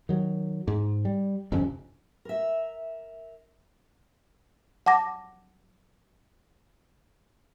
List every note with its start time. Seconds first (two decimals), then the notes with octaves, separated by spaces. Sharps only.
0.09 D#3 F#3
0.68 G#2
1.05 G3
1.52 G1 F2 C3 C#4
2.25 A#4 E5
4.86 F#5 A5 D6 A#6